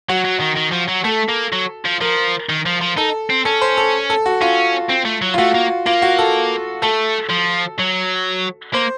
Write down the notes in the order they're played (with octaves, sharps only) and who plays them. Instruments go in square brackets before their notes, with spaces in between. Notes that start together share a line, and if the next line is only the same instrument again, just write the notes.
[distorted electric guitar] F#3 [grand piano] F#4
[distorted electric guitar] F#3
D#3
D#3
F3
F#3
[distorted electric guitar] A3 [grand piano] A4
[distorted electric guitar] A#3
F#3
F3
[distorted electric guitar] F3 [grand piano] A#4
[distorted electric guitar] D#3
F3
F3
[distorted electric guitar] D#4 [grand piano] A4
[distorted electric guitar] C4
[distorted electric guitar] C#4 [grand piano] A4
[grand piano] C5
A4
A4
F#4
[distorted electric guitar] C#4 [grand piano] F4
[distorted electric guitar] C4
A3
F#3
[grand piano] F4
[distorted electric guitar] A3 [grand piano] F#4
[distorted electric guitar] A#3
[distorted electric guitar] A#3 [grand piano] F4
[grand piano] F#4
A4
[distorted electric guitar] A3 [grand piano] A4
[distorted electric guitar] F3
F#3
[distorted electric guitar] A#3 [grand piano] C5